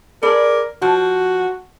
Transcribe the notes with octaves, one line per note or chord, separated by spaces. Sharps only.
G#4 A#4 B4 D5
F3 F#4